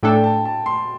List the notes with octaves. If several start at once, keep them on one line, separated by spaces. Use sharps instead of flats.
A2 A3 D4 A4 G5
A5
A5
C6